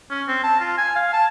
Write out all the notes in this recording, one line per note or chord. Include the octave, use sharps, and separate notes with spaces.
C#4
C4
A5
F4
G#5
F5
A5